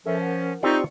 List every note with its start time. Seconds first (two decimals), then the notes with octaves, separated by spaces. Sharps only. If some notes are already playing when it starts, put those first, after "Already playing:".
0.06 F3 C#4 A4 A#4 E5
0.18 A#4 F#5
0.63 C4 D#4 F4 G4 D5 C#6